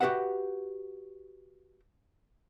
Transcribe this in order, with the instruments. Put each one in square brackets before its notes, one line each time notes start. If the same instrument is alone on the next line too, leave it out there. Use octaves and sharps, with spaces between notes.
[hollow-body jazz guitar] F#4 G4 A4 B4 E5 F#5